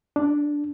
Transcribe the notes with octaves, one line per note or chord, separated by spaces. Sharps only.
D4